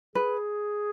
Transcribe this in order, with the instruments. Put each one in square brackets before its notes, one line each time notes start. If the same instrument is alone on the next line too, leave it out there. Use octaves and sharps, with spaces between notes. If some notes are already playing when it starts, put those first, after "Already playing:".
[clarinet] G#4 [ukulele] B4